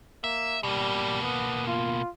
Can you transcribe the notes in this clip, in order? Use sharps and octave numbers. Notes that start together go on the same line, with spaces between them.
A#3 E5
B2 G3 A#3
B3
F4